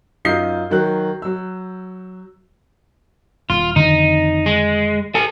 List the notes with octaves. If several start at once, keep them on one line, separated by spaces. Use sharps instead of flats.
F#2 D#4 F4 D#6 G6 C7
D#3 F#3 F#6
F#3 E6
D#1 F4
F1 D3 D#3 D#4
G#3
A4 G#5